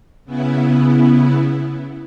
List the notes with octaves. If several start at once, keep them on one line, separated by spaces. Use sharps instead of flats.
C#3 B3 E4